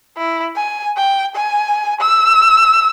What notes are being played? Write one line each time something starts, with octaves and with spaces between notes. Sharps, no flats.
E4
G#5
G5
G#5
E6